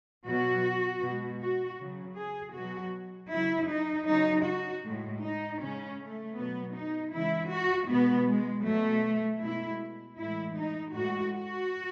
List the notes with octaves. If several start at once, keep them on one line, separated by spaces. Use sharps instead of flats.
B2 F#3 F#4
B2 G#3
F#4
C#3 F#3
G#4
B2 F#3 F#4
C#3 F#3 E4
D#4
C#3 F#3 D#4
F#4
A2 G#3
D#4
C#3 G#3 C#4
A3
B2 F#3 B3
D#4
C#3 E3 G#3 E4
F#4
B2 G#3 B3
G#3
B2 F#3 A3
B2 G#3 E4
A2 E3 G#3 E4
D#4
A2 G#3 F#4
F#4